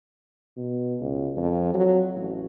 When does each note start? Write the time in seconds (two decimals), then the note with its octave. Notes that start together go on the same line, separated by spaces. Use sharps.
0.57 B2
1.00 C#2
1.37 F2
1.74 F#3
2.16 A1